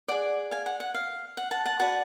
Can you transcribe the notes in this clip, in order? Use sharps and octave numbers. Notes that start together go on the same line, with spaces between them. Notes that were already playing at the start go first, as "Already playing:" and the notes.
G#4 D5 F#5
F5 G#5
F#5
F#5
F5
F#5
F#5 A5
F#5 A5
F#4 B4 D5 F#5 A5